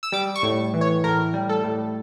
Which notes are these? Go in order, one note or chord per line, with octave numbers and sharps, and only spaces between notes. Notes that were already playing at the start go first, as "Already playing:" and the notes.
E6
G3 D6
C#6
A2
E3
C#5
A2 A#4
G3
A4
A2